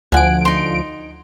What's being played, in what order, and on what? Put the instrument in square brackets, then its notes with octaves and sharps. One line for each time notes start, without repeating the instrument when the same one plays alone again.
[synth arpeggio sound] D2 F3 D7 [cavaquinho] F#5 G#5
[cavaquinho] D#4 C6